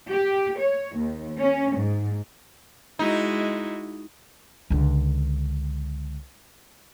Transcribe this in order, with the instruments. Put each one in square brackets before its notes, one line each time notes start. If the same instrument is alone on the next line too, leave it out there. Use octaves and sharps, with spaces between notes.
[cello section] G4
C#5
D#2
C#4
G#2
[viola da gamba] G#3 E4 F#4 [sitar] D#4
[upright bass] C#2 D3